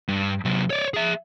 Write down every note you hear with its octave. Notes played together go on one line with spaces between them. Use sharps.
G2
C3 F#3
C#5 D5
G#4 E5